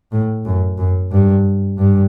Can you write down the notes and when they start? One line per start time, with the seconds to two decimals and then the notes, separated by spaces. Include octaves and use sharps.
0.12 A2
0.45 F#2
0.78 F#2
1.12 G2
1.78 G2